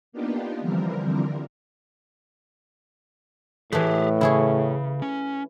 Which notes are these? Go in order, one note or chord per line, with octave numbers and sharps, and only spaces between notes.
A#3 B3 D4 D#4 F4 G4
D3 E3 F3 G3 C4 A#4
A2 E3 A3 G4 G#4
C#3 E4 G#4 C#5
C#4